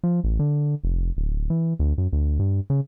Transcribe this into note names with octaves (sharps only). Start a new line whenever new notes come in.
F3
A1
D3
F1
D1
E3
D2
F#2
D2
G2
C#3